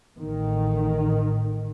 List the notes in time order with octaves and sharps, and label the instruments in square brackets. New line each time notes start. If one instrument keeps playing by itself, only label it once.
[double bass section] A1 A2 D#3